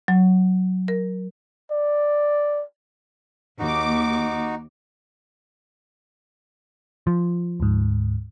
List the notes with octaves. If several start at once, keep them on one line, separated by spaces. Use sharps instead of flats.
F#3
A#4
D5
D#2 D#4 F#4 D6
F3
D2 G#2